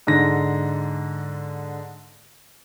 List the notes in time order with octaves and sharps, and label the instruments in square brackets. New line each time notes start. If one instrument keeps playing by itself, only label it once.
[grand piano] G#2 D3 A#6